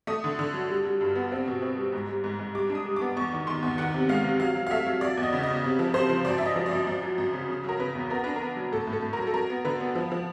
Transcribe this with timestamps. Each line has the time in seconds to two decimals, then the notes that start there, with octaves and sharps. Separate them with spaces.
0.07 A3 D#6
0.24 D3
0.39 D3
0.54 F#3
0.69 G3
0.85 G3
1.01 G2
1.15 B3
1.32 C4
1.47 B2
1.62 C4
1.78 G3
1.92 G#2
2.09 G3
2.24 G#2
2.39 G#2
2.55 G3 D6
2.70 D4
2.75 D#6
2.86 G3
2.96 B3 D6
3.17 E2 C#6
3.32 D#3
3.47 D#3 C6
3.63 E2
3.78 D#3 F#5
3.94 C3
4.09 G#3 F5
4.24 C3
4.40 F#3 F5
4.56 F#3
4.67 F5
4.71 A3 E5
4.86 F#3
5.01 F#3 D5
5.17 E2
5.23 D#5
5.32 C#3
5.43 C#3 D#5
5.64 C3
5.79 F3
5.94 C3 C5
6.10 F3
6.25 F#2 D5
6.38 F#2 E5
6.46 D#5
6.56 F3
6.66 D5
6.71 F#2
6.87 F#2
7.03 F#3
7.18 F#2
7.33 C#3
7.48 C#3
7.64 F#3 A#4
7.80 C#3 B4
7.95 E2
8.10 B3 A#4
8.24 D4 B4
8.36 A#4
8.41 B3
8.57 F#3
8.72 A2 A4
8.87 A2
8.93 A4
9.02 A2
9.13 A#4
9.19 F#3
9.27 A4
9.34 F#3 A#4
9.50 B3
9.65 D3 B4
9.80 B3
9.95 F3
10.12 F3